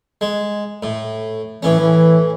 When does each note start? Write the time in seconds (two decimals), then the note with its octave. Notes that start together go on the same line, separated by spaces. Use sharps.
0.21 G#3
0.83 A2
1.63 A2 E3 C#4
1.80 E3